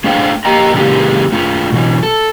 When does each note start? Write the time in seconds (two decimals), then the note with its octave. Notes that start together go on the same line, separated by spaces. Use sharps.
0.04 A3 D4 G#4 C5 F5 G5
0.45 F2 A#3 G4 D#5 G5 A#5
0.74 C#3 E3 G#3 A#3 G4 G#4
1.32 A3 F4 G#4
1.72 B2 E3 F#3
2.03 A4